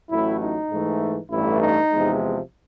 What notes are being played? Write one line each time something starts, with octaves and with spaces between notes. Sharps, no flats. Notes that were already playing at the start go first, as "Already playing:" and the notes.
A1 A2 F#3 E4
D#4
G#2 E3 A3
A1 G2 E3 A3 E4
D#4
E2 C3 F3 G#3